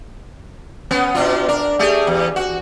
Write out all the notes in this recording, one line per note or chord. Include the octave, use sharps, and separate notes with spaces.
B3 C#4
B2 D4 F4
D4 A#4
A3 G4 G#4
E2
F#4